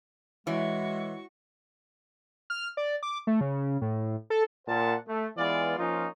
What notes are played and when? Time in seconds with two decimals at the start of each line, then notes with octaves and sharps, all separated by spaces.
0.47 E3 G#3 E4 F#4 C#5 E5 C#6
2.50 F6
2.77 D5
3.03 D6
3.27 A3
3.41 C#3
3.82 A2
4.30 A4
4.67 A#2 A#3 C5 F#5 A5
5.07 A3
5.37 E3 G#3 B3 F4 D5
5.78 F3 A#3 C#4 D#4 F4